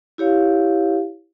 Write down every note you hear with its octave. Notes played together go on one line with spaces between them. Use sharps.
E4 G4 C#5 F5